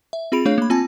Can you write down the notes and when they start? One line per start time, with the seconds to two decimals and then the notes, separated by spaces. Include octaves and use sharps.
0.13 E5
0.32 C4 F4 G#4 B5 D7 F7
0.45 A3 D4 G#4 C#5 F5
0.58 A#3 B5
0.70 C4 F4 G#5 A5